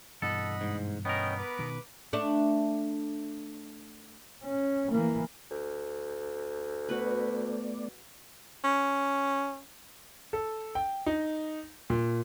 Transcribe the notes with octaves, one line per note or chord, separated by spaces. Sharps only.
G2 B2 E3 A4 D#5 F#5 B5
G#2
B3 C#4 A#4 D#5 G5
B4 D6
B2 D#3
A3 D4
C#4
E3 A#3
D2
A3 B3 F#4 B4 D5
C#4
A4
G5
D#4
A#2